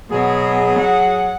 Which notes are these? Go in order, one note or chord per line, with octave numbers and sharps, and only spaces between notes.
B2 F#3 G#4
F#5